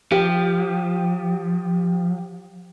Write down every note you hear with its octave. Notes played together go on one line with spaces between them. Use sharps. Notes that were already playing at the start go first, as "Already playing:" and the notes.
F3 G4